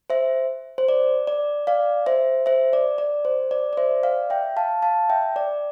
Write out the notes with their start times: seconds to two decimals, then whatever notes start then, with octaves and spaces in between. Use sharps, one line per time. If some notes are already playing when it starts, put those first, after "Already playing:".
0.10 C5 E5
0.78 C5
0.89 D5
1.27 D5
1.67 D5 F5
2.06 C5 E5
2.46 C5 E5
2.73 D5
2.98 D5
3.25 C5
3.51 D5
3.73 D5
3.77 C5 E5
4.03 D5 F5
4.30 E5 G5
4.57 F5 A5
4.82 F5 A5
5.10 E5 G5
5.36 D5